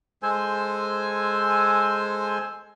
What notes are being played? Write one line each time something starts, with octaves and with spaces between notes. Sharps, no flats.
G#3 A4 C5 G#5